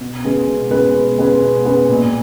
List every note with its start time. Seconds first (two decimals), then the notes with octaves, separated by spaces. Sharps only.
0.01 B2
0.24 G#3 C#4 G#4 B4
0.48 B2
0.71 G#3 C#4 G#4 B4
0.95 B2
1.18 G#3 C#4 G#4 B4
1.42 B2
1.65 G#3 C#4 G#4 B4
1.89 A#2